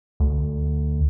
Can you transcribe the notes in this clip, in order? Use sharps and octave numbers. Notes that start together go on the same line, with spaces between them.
D2